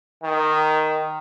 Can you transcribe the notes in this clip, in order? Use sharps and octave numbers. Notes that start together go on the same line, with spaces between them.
D#3